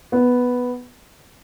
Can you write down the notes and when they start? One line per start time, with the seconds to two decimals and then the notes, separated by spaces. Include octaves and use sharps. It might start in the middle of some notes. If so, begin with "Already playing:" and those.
0.12 B3